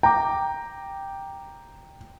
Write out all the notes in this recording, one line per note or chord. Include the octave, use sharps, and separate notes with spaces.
G5 A#5 D6